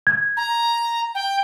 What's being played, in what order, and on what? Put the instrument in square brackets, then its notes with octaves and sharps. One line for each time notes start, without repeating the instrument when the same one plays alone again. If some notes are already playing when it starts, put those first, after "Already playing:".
[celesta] G#6
[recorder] A#5
G5